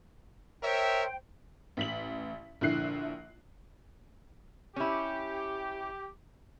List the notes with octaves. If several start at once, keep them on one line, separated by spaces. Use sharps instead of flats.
A#4 C5 C#5 E5 G5
A1 B6 F#7
A#1 D3 E4 F#6 C7
C#4 E4 G4